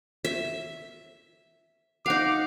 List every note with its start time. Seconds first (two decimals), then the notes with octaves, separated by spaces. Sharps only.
0.25 E5
2.06 D#4 F5 F#5 D6